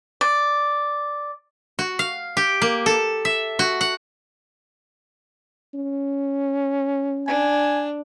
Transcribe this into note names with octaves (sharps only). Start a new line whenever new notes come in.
D5
F#4
F5
G4
A#3
A4
E5
F#4
F#5
C#4
D4 G#5